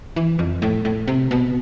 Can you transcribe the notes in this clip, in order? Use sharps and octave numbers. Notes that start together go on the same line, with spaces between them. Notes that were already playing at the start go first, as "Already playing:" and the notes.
E3
F2
A2
A2
C3
B2